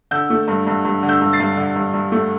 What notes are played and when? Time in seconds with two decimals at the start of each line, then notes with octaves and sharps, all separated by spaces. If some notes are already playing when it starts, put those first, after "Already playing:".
0.11 D3 E6 G6
0.30 A3
0.48 G2
0.67 G2
0.85 G2
1.03 D3
1.09 E6 G6
1.21 G2
1.33 A6 C7
1.40 G2
1.57 D3
1.76 G2
1.94 G2
2.12 A3